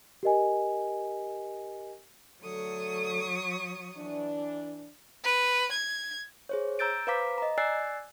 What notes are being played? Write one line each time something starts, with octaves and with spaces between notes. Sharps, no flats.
G4 A#4 D#5 G#5
D3 F#3 A3 A4 C#6 D#6
E3 D4
B4
G#6
G#4 C5 C#5
A#5 E6 G6 A6 D7
B4 C5 F5 A#5 D6 B6
D#5 A#5
D5 G#5 E6 F#6 A6 C7